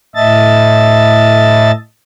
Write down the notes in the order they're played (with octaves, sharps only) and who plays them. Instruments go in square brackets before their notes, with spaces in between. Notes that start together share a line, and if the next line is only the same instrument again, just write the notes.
[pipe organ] A2 D#5 E5 A5 A6